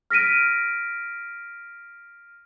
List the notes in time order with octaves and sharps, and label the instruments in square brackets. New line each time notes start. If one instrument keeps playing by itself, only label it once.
[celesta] F6 A#6 B6 D7 D#7